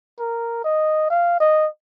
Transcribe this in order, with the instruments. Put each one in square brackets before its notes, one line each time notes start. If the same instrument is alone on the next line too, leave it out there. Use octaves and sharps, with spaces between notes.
[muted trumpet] A#4
D#5
F5
D#5